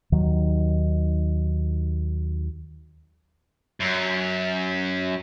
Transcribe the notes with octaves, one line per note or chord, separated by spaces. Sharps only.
D#2 D#3 F#3
F#2